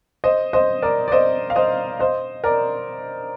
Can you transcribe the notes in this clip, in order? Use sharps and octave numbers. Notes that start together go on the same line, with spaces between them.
C5 D#5
C5 D#5
A#4 D5
D5
C5 D#5
F5
C5 D#5
C5 D#5
A#4 D5